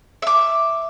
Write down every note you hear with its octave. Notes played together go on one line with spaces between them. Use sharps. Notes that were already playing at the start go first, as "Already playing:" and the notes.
E5 D6